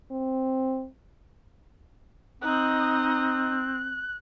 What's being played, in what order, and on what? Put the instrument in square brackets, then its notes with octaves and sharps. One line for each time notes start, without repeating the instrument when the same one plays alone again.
[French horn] C4
[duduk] C4 [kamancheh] D#4 D#5 [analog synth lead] F#6